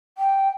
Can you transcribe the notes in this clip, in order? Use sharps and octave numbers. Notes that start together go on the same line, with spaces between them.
G5